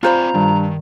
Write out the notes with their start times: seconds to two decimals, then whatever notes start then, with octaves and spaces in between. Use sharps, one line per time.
0.03 C4 F4 C5 D5 G#5 A#5 B5
0.34 G2 D#3